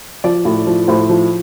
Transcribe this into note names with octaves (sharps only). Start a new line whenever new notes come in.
F3 D5
A2
F3
A2 C5
F3